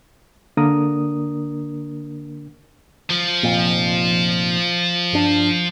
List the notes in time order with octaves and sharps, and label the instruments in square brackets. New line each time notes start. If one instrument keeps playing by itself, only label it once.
[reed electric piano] D3 A#3 D4 A#4 D#6
[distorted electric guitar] F3
[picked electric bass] F1 F2 A#2
G2 D4